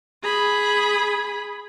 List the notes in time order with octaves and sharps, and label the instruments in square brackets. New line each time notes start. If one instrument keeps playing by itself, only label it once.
[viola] G#4 B5